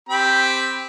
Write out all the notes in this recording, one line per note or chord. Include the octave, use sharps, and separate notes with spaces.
C4 G4 B5